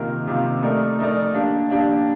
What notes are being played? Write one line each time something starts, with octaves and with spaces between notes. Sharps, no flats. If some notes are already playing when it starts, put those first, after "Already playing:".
Already playing: C3 D#3 A#3 F4 A#4
C3 D#3 A#3 F4 A#4
A3 D#4 A#4 D5
A3 D#4 A#4 D5
A#3 D4 G4
A#3 D4 G4